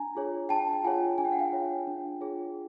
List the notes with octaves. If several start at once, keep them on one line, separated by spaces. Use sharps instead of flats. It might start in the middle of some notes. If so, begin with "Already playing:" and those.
Already playing: D4 G#5 A#5
F4 G#4 C#5
D4 G5 A5
G5
F4 G#4 C#5 F#5 G#5
D4 G#5
G5
F#5
F5 G5
F4 G#4 C#5
D4
F4 G#4 C#5